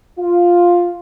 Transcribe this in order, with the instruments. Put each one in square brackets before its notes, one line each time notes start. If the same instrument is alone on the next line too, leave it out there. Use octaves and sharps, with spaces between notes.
[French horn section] F4